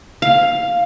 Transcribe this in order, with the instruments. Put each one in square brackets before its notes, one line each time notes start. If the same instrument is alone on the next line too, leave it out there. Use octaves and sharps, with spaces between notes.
[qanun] F5